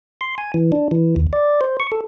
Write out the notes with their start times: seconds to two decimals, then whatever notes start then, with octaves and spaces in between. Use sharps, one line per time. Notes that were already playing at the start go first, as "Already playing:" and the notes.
0.21 C6
0.38 G#5
0.54 E3
0.72 D4
0.91 E3
1.16 D#2
1.33 D5
1.61 C5
1.80 C#6
1.92 A4